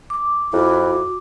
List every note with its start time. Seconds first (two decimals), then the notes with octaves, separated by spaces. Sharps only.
0.10 D6
0.53 F2 E4 F#4